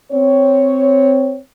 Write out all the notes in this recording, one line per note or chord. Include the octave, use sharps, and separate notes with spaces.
C4 C#5